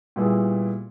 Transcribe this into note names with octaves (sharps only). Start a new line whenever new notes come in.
A#2 G3 B3 E4 G#4